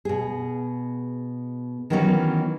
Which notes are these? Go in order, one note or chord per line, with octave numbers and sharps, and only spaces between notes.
B2 G#4
D#3 E3 F#3 B3 C#4 F#4